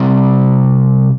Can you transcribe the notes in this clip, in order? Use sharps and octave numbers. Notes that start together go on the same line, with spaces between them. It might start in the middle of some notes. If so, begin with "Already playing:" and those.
Already playing: C3 G3 C4 A#5